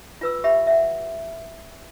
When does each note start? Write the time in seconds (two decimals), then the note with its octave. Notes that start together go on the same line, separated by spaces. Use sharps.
0.21 F4 B4 E6
0.44 G4 E5 B5
0.67 E5 F#5